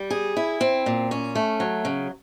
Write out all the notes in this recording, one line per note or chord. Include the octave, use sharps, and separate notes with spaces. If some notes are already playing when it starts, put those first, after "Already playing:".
Already playing: G3
G#4
E4
C4
A#2
C#4
A3
F#3
C#3